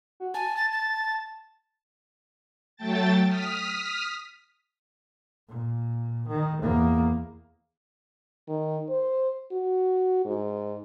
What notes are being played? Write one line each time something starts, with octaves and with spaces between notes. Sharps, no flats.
F#4
G#5 A5
A6
A6
F#3 A3 G5 A5 A6
D#6 F6 B6
A#2
D#3
E2 A#3
D#3
C5
F#4
G#2